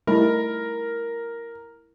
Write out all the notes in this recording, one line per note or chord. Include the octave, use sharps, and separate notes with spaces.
G3 A3 D#4 E4 A#4 B5